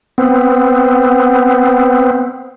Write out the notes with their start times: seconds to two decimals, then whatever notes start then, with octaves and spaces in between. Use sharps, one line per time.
0.18 B3 C4